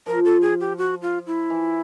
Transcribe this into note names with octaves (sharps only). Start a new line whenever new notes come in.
F3 A#4
A4
G#4
G4
F#4
F4
E4
E3